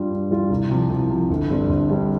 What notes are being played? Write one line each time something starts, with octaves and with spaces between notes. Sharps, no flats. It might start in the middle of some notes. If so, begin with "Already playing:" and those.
Already playing: G2 G3 F4
G2
G3 F4
C2
C3 F3
C2
C3 F3
G1
G2 G3 C4
G1
G2 G3 C4